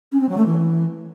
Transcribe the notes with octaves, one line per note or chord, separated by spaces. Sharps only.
C#4
C4
F#3
A3
E3